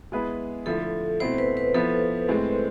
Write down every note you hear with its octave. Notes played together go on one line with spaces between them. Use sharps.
G#3 B3 E4 G#4 B4
D3 F3 A3 E4 A4
B2 A3 C4 E4 C5
B4
B4
F3 B3 E4 A4
A2 G#3 C4